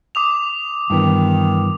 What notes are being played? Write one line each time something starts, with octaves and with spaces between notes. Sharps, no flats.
D6 D#6 F7
G2 D#3 E3 B3